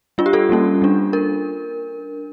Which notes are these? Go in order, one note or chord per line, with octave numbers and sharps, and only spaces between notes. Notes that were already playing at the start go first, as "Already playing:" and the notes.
G3 D4 F4
G4
F4 A4
G3 A#3 C#4
G3 D4
D4 A#4